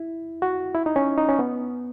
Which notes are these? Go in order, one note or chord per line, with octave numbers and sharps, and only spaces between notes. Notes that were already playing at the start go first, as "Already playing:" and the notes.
Already playing: E4
F#4
E4
D#4
C#4
D#4
C#4
B3